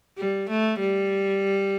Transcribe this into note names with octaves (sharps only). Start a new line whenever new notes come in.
G3
A3
G3